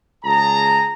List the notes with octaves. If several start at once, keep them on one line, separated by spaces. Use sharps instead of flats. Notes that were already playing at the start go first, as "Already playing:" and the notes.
C#2 G#4 A5 A#5